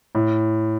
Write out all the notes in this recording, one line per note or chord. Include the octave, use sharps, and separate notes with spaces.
A2